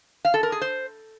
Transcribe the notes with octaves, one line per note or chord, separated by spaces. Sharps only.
F5
A4
A#4
G#4
C5